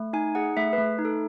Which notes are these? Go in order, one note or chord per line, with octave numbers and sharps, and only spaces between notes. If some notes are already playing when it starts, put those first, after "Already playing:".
Already playing: A3
D#4 G#5
G#4 F#5
A3 E5
B4
A3
D#4
A4